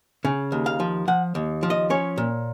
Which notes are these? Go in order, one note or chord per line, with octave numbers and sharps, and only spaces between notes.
C#3
D#2
F5
F3
F3 F#5
D#2
F3
D#5
C#4 C#5
A#2